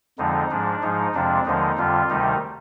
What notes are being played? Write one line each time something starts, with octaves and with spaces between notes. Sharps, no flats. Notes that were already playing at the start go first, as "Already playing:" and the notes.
F2 D3 F3 G#3 D#4
G#2 F3 G#3 D4
G#2 F3 G#3 D#4
F2 C3 F3 G#3 D4
D#2 D3 F3 G#3 D#4
F2 D3 G3 F4
D2 C3 D#3 G3 D#4